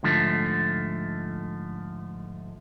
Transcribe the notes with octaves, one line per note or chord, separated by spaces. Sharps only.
G#2 D3 F3 A3